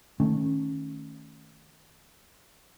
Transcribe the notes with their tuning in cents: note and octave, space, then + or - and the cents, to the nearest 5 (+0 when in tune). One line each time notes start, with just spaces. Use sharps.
D#3 +0 A3 +0 C#4 -10